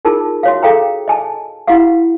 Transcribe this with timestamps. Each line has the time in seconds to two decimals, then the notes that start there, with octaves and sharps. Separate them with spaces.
0.05 D#4 F4 G#4 A#4 A5
0.43 F#4 C#5 F5
0.63 G#4 A4 F5 G5 A#5
1.08 D#5 G#5 A5
1.67 E4 F#4 G4 F5 F#5